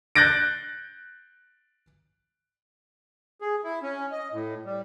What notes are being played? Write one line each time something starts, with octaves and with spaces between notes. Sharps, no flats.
F#6 G6 A6 A#6 D7
G#4
E4
C#4
D#5
A2
G3